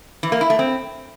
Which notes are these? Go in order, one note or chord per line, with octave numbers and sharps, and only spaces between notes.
E3
A#3
E4
A3
C4